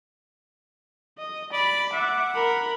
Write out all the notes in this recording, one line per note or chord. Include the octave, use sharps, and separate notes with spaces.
D#5
D5 B5
E5 F#5 D6
A#4 B5